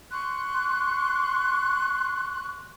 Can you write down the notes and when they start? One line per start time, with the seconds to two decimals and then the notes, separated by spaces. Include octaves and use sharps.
0.11 C6 C#6 F#6